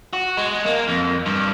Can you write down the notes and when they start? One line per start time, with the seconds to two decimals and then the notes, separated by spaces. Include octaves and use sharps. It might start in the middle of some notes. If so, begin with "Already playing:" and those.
0.13 F#4
0.37 G#3
0.66 A#3
0.88 F2
1.26 G2